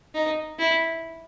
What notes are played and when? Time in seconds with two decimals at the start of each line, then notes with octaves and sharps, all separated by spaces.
0.15 D#4
0.59 E4